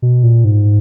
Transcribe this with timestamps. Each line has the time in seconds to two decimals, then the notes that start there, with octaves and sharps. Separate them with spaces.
0.02 B2
0.23 A#2
0.44 G#2